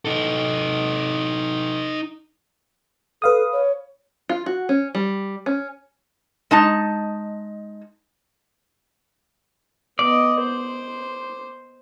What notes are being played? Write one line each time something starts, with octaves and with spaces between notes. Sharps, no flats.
D#4 A4
A4 B4 F5 D#6
C#5
F4
F#4
C#4
G3
C#4
G#3 D#4 A5
B3 D5 D#5
C5